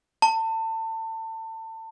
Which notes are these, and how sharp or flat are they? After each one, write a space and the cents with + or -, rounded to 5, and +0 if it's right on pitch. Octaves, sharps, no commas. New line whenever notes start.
A5 +30